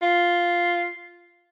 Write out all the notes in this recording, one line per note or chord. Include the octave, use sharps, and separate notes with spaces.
F4